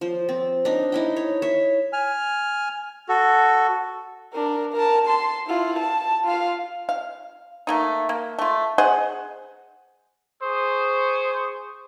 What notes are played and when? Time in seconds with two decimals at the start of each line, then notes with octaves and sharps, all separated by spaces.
0.01 F3 C5
0.29 C4
0.65 D4 D#4
0.92 D#4 E4 G5
1.16 C#5
1.42 C#5 E5
1.93 G#5 F6
3.09 F#4 A4
4.33 D4 A#4
4.73 A#4 A5
5.06 A5 C6
5.47 E4 F4
5.79 A5
6.25 F4 F5
6.89 F5
7.67 A3 A#3 D#4
8.09 A#3
8.39 A3 F4
8.78 G#4 C5 D#5 F#5
10.42 G#4 C5 C#6 D#6